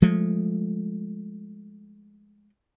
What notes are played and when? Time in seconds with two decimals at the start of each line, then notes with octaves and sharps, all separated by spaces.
0.02 F3 G#3 A3